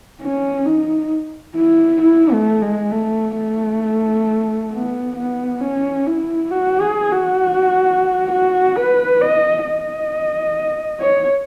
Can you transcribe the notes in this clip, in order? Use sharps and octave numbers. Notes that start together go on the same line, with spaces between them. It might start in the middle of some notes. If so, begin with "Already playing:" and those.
C#4
D#4
E4
E4
A3
G#3
A3
A3
B3
B3
C#4
E4
F#4
G#4
F#4
F#4
B4
D#5
D#5
C#5